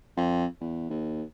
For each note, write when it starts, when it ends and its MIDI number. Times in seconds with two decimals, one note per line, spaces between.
0.17 0.46 41
0.61 0.87 40
0.90 1.23 39